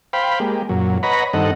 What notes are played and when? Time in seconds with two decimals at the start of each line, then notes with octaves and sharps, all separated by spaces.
0.13 C5 F5 G5 B5
0.40 G#3 A#3 G4
0.69 F#2 A#2 F#3
1.03 B4 C#5 D#5 F#5 A#5 B5
1.33 G2 D#3 C4 A4 D#5 F#5